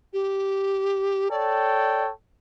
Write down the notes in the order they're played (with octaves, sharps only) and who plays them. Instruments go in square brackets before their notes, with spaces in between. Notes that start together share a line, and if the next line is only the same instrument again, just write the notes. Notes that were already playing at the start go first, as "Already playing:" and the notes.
[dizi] G4
[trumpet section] A4 C#5 G5 [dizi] D5